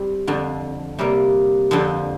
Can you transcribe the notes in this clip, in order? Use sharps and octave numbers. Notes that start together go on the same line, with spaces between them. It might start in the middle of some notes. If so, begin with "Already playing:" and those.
Already playing: G3 C4
F2 D3 F3
C3 G3 A#3
F2 D3 F3 C4